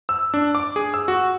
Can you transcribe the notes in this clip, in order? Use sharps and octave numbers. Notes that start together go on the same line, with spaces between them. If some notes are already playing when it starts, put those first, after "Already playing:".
E6
D4
D6
G#4
E6
F#4